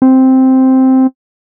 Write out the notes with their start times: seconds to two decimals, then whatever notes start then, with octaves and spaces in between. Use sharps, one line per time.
0.02 C4